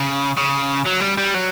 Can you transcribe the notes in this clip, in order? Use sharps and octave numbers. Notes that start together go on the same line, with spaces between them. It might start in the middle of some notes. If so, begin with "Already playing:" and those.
Already playing: C#3
C#3
F#3
G3
G3
F#3